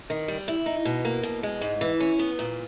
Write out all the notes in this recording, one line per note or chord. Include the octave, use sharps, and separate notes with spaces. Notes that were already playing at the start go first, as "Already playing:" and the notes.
D#3
G3
E4
D#4
B2
A#3
B2
G#3
G#2
E3
C#4
B3
A#2